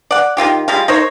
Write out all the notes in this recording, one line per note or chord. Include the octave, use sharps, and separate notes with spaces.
D5 F#5
D#3 G3 F4 G4
G3 G#3 F4
D#4 A#4 C5 C#5